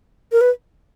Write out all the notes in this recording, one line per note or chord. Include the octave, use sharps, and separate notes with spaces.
A#4
B4